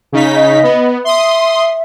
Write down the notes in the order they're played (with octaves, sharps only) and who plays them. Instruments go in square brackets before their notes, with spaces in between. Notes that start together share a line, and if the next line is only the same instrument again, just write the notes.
[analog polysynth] C#3 D#4 B6
[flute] D#5
[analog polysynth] B3
[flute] E5 [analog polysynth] C6 D#6